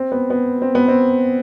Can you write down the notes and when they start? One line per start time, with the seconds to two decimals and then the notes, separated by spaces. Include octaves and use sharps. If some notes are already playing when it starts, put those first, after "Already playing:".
Already playing: C4
0.12 B3
0.30 B3
0.62 C4
0.75 B3
0.88 C4